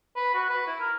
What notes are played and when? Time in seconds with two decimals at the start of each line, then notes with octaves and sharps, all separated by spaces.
0.16 B4
0.34 F#4
0.49 B4
0.67 E4
0.80 A#4